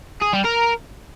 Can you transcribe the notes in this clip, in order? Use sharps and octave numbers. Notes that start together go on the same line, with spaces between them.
G#4
G3
A#4